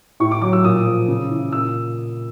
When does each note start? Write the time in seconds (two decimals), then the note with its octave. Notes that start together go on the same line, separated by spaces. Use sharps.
0.20 A2 C#6
0.31 D6
0.41 F#3 D6
0.53 E6
0.64 A#2 D#6
0.86 F3
1.08 C#3
1.30 E3
1.52 A#2 E6